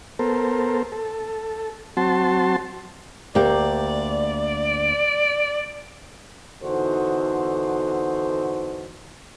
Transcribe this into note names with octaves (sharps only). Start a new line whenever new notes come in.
B3 A4 A#4 C5
A4
F#3 C4 F#4 A5 C6
D2 A#3 G4 D5
E2 D3 D#4 F#4 A4 C5